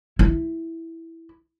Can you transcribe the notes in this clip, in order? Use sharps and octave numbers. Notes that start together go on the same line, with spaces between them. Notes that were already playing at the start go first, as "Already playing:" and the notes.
E4